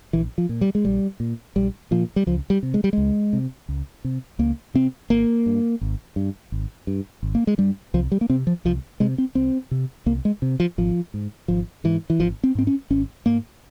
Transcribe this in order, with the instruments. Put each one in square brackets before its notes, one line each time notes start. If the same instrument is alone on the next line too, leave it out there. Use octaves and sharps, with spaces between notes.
[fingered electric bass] A#1 E3
F3
A#2
G3
G#3
A#1 G3
A#2
A#1 G3
A#2 F3
G3
C#2 F3
G3
C3
G#3
G3
C#2 G#3
C3
C#2
C3
C#2 A#3
C3 C4
G#1 A#3
G2
G#1
G2
G#1
G2
G#1
A#3
G#3
G2 G3
C2 F3
G3
A#3
C3 C4
F3
C2 F3
C3 G#3
C4
C2 C4
C3
C2 A#3
G#3
C3
F3
G#1 F3
G#2
G#1 F3
G#2 E3
E3
G#1 F3
C4
G#2 C4
C#4
G#1 C#4
G#2 A#3